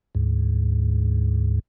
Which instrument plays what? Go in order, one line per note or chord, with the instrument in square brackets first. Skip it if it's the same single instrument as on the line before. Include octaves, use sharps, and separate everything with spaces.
[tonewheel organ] D2 G#2